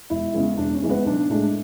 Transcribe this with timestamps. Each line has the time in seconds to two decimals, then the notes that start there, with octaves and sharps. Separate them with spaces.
0.10 E1 E4
0.34 E2 C#3 E3 G#3
0.57 E1 D4
0.75 C#4
0.82 E2 C#3 E3 G#3
0.89 B3
1.06 B1 D4
1.29 A2 G#3 D4